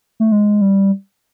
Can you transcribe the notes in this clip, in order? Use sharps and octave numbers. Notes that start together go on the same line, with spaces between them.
A3
G#3
G3